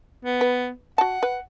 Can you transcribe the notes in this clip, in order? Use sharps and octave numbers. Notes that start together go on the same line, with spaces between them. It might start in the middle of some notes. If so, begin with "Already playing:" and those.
B3
B4
F#4 F#5 A5
B4